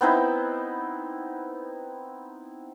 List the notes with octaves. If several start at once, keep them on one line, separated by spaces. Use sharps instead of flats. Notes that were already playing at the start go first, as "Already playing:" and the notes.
B3 C4 D#4 E4